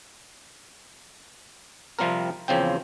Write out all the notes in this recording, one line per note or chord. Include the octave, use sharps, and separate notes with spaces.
C3 F3 G3 C4 A#4
E2 C#3 F3 C4 G5